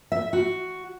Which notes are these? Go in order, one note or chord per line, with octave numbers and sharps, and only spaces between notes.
E5
F#4